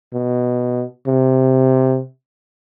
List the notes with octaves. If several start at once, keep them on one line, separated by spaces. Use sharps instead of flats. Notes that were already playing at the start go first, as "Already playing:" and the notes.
B2
C3